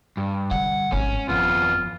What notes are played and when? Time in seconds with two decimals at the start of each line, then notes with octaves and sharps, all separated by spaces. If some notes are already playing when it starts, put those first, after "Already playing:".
0.17 G2
0.51 D3 G3 F#5
0.92 G#1 G#2 C#4
1.29 G1 F2 B3 F4